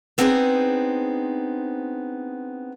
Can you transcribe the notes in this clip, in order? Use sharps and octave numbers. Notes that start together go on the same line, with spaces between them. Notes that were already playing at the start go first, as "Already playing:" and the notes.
B3 C4 D4 D#4 G#4 C5